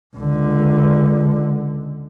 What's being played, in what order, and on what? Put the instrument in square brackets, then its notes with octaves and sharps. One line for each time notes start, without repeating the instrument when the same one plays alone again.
[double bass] C#2 D3